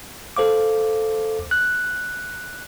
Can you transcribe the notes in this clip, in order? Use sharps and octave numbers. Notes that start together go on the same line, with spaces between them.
A4 C5 F5 D6
F#6